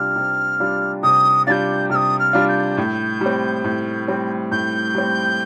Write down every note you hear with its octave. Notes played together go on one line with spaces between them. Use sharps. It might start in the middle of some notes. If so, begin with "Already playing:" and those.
Already playing: C3 G3 D4 F4 F6
C3
G3 D4 F4
C3 D#6
G3 D4 F4 G6 A6
C3 F6
D#6
F6
G3 D4 F4
G6
A2
G3 C4
A2
G3 C4
A2 G6
G3 C4